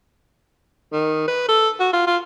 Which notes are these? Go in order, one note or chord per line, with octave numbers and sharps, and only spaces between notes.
D#3
B4
A4
F#4
F4
F4